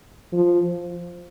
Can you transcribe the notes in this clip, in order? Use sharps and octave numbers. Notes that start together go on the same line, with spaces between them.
F3